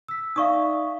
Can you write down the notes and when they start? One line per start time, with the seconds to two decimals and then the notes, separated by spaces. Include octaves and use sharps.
0.08 E6 B6
0.36 D#4 D5 E5 F5 C#6 D#6